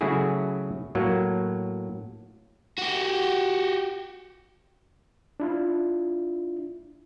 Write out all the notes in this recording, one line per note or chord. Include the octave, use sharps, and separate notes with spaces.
C#3 F#3 A3 E4 F#4 G#4
A2 F#3 A#3
F#4 G4
D4 E4 F4